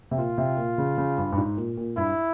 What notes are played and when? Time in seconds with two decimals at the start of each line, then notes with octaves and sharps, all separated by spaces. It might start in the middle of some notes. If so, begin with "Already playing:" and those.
0.11 C3
0.18 A#2 F4
0.38 C3
0.57 A#2
0.78 C#3
0.98 C#3
1.18 G2
1.32 G2
1.38 G#2
1.57 A#2
1.77 A#2
1.97 G2 E4